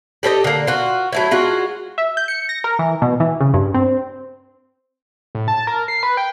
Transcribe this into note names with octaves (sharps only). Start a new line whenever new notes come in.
G4 A4 C5 D#5
D3 A#3
F4 F#4
F#3 A3 E4
G#3 F4 F#4
E5
G6
C#7
A#6
A#4
E3
B2
E3
C#3
G2
C4
A2
A5
A#4
C7
B4
G5